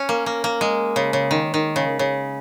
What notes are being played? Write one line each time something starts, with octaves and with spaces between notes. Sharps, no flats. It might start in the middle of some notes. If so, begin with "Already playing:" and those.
Already playing: C#4
A#3
A#3
A#3
G#3
C#3
C#3
D#3
D#3
C#3
C#3